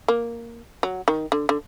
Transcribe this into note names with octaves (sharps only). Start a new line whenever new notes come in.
A#3
F#3
D#3
D3
D3